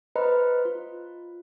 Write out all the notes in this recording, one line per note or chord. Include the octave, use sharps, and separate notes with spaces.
B4 C5 D#5 A#5 B5
F4